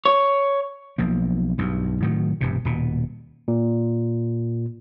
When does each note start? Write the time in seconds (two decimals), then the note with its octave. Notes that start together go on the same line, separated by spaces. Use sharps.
0.06 C#5
0.98 B1 F3 A#3
1.58 B1 G2
2.02 A2 D#3 F#3
2.41 E1 G2 C3
2.65 D#1 B2
3.48 A#2